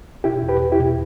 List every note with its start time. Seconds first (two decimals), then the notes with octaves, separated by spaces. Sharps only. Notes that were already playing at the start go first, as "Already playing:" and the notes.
0.24 B2 E4 G4
0.43 E2
0.48 G4 B4
0.61 E2
0.72 E4 G4
0.79 B2